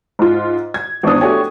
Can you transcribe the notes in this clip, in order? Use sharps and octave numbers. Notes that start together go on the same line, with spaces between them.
G#2 F4
G#6
G#1 E2 B3 D4 D#6
A3 D4 F#4 G4 C#5 G#5